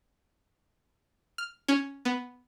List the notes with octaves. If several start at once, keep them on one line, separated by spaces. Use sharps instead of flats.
F6
C#4
B3